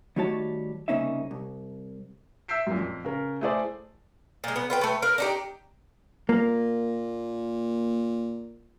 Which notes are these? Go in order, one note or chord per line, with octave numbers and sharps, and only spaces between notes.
D#3 G3 A3 F#4 C#5 A5
C2 C#3 A#3 C#4 D#4 E5
C2
E5 E6 G6 B6 C7 D7
F#2 A#2
F2
C#3 A#4
A3 E4 G#4 C5 D5
A#2 G#3
B3
F4 B4 G5
A3 B4
A#4 B4 F5
D4 D#4 G4
A#2 A#3